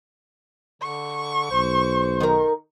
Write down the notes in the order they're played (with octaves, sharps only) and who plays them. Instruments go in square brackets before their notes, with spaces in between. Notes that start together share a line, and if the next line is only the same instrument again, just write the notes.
[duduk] D3 [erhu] C#6
[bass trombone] B1 [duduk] C5
[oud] D#3 A#4